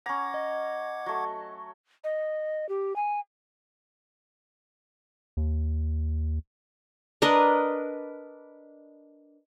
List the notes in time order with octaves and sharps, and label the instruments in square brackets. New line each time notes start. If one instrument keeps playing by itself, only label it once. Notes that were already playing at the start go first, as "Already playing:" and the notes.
[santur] C#4 A#5 [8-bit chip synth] F#5 D6 G#6
[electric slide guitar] D#5
[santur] F#3 A3
[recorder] D#5
G4
G#5
[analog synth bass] D#2
[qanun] D4 A#4 B4 D#5